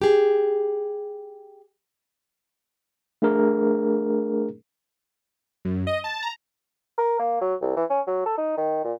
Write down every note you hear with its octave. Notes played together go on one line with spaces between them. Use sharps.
G4 G#4
A3 D4 G#4 A#4
F#2
D#5
A5
A#5
A#4
A#3
F#3
C2
E3
C#4
F#3
A4
D#4
D#3
A#2